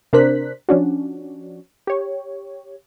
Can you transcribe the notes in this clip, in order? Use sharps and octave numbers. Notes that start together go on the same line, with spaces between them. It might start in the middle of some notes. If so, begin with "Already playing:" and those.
C3 D4 A#4 C5 F#6 B6
F3 C#4 D4 F#4
G4 C#5